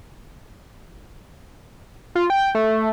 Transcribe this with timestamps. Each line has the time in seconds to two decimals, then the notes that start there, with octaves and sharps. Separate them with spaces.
2.15 F4
2.30 G5
2.55 A3